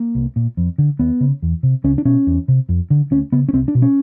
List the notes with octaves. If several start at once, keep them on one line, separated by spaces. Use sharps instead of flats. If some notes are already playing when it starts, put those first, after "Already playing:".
Already playing: A#3
C2
A#2
F2
D3
D#2 B3
C#3
E2
C3
C#2 C#4
D4
B2 C#4
E2
C3
F2
D3
D2 C#4
C#3 B3
C#4
C2 C4
D4
B2
C#4